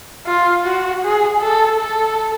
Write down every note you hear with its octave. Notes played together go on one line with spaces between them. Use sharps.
F4
F#4
G#4
A4
A4